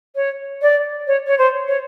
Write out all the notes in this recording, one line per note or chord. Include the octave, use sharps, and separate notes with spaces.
C#5
D5
C#5
C#5
C5
C#5